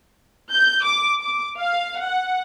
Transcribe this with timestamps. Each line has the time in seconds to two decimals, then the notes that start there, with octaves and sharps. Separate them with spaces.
0.52 G6
0.83 D6
1.19 D6
1.58 F5
2.05 F#5